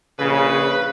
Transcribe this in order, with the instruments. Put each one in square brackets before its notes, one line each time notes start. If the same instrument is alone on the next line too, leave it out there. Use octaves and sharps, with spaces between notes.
[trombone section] A#1 C#3 [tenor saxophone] B4